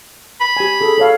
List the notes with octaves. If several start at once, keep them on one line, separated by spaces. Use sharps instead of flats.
B5
G4 G#5
G#4 A4
A4 C#5 F5